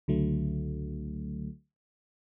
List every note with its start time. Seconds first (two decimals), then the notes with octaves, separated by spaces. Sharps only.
0.08 C#2 D3 F#3 A3